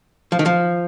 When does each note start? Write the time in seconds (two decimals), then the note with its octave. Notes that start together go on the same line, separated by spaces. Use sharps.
0.32 F3
0.39 D#3
0.46 F3